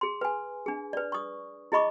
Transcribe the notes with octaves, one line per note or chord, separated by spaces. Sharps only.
G#4 C6
B4 G#5
D4 G#4
B4 D5
C#6 D#6
E4 G#4 D#5 B5 C#6 D6